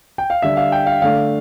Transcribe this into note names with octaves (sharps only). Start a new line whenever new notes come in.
G5
F5
D3 G3 D4 E5
F5
G5
F5
D3 A3 D4 F5